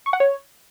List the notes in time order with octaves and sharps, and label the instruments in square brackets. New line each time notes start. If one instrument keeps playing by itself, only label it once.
[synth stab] C#6
F#5
C#5